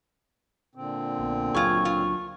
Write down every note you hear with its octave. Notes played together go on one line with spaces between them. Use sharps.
A#2 D3 C4
A#1 B3
C#2 F#3 D4 F4 G#4 C#6
F4